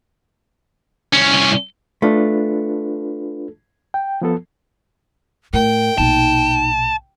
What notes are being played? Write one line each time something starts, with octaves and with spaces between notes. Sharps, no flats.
C2 C#4
A3 D4 F4 B4
G5
F3 B3 A4
A2 A#4 G5
A#1 B2 D#4 A5